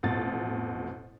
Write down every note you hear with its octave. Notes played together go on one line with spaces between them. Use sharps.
A1 F2 B2 A6